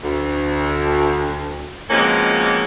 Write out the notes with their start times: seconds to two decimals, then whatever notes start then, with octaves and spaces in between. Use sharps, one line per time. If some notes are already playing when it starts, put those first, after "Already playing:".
0.02 D2
1.90 B2 F3 G#3 A#3 C4 C#4